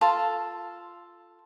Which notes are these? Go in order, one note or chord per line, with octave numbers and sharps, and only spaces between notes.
F4 A4 A5